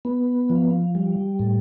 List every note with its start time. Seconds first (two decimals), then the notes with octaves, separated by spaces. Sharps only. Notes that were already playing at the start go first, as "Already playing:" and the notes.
0.05 B3
0.50 F3
0.95 G3
1.39 A2